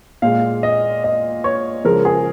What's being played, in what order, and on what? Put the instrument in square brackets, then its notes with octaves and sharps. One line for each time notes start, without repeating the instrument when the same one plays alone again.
[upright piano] A#2 G#3 F5
D#5
D#5
C#5
C#3 F3 G#3 A#4
G#4